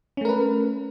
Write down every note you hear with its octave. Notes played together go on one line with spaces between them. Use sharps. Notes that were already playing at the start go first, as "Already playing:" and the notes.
A3 C#4 A#4 B4